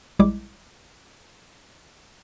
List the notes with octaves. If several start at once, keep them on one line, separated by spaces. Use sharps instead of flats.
A#1 G3 G#3 E4 D6